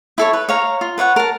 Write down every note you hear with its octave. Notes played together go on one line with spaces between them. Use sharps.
E4 A4 C#5
B4
C#5 F5 A#5
F4
B4 C#5 F5 F#5
A#4 A5